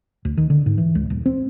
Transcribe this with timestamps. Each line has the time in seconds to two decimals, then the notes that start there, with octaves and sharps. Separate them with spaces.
0.25 D2
0.37 D#3
0.50 D3
0.66 G#2
0.78 E3
0.95 C#2
1.10 D#1
1.26 C4